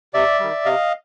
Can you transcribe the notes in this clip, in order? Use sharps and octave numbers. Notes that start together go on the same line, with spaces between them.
C3 D5 E5
D#3 G3
C3 D#5 F5